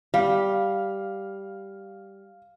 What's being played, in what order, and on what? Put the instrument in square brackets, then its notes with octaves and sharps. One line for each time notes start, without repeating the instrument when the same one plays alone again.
[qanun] G3 [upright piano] F5